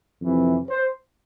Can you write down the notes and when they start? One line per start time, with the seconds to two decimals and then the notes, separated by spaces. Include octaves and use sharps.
0.20 F2 C3 E3
0.69 C5